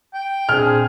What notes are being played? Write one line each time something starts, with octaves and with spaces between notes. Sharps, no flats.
G5
A#2 C4 D4 G#4 F6